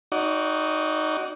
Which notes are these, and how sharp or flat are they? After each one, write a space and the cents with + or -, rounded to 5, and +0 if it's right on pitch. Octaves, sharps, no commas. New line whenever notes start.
D#4 +0 F#4 +0 D5 -35